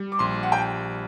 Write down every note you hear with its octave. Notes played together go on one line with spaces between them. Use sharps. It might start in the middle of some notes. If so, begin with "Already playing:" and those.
Already playing: G3
D6
A#1 C6
F#5
G5